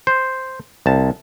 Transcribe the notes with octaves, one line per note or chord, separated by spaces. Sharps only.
C5
C2 A5